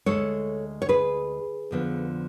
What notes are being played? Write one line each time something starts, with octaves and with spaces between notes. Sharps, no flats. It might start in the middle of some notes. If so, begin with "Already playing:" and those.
D2 C#3 G#3 A4 C#5
C#5
G#4 B4
F2 D3 F3 B3